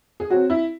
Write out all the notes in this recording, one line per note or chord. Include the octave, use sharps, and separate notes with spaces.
G#4
F#3 C4 F#4
E4